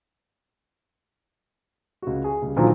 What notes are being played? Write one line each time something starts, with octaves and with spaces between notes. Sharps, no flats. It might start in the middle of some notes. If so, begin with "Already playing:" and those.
C#2 F#4
G#4
C#2 G3
A#2 D3 D#3 F3 F#3 A#3